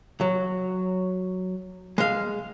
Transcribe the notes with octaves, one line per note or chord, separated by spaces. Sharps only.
F#3
G#3 F5